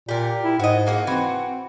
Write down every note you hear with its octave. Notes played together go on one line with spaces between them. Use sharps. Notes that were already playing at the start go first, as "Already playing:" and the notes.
A#2 G4 A#4
E4
G#2 F#4 D#5
G#3 A#3 F#4
E3 C4 F#4